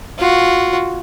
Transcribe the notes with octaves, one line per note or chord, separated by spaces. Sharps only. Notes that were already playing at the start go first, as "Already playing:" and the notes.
F4 F#4